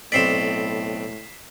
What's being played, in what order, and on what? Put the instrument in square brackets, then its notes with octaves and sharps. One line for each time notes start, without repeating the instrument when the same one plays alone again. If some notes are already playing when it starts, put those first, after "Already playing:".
[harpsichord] B1 C4 D5 [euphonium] A2 [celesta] B6 C7 E7